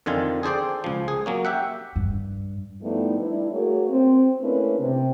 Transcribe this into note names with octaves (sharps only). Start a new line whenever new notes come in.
F2 D3 D#3 F4 G#5
G#4 A4 C5 D5 G5
C#2 F3
G#4
F#3 A#3 C#4
G4 E5 F#5
G2
F3 G3 A3 B3 D#4 E4
G2 E4
A3 A#3 F#4 G#4 C#5
C4
A3 A#3 C#4 D4 E4 B4
C3